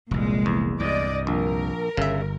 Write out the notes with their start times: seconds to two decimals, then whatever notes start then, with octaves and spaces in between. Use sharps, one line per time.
0.11 F1 C2 A#2 G#3
0.46 E2
0.80 C2 G2 D5 D#5
1.27 A#1 A#4
1.97 G1 C#3 E5